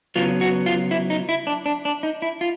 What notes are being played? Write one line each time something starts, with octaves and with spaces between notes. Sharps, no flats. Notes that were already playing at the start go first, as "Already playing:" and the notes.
C#3 F#3 B3 F4
F#4
F4
E4
D#4
E4
D4
D4
D4
D#4
E4
F4